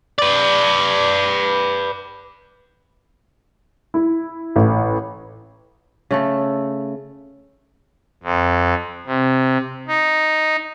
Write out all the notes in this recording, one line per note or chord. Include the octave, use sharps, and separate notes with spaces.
B4 D5
E4
A1
C#3 A3 A4
F2
C3
D#4